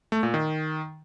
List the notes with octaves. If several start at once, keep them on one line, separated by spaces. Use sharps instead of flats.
A3
A#2
D#3